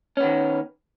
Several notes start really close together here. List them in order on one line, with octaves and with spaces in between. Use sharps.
C#4 B3 D#3